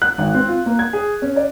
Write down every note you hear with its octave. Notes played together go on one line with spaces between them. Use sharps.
F#6
G#1
C4
F4
A#3
G#6
G#4
C#4
D5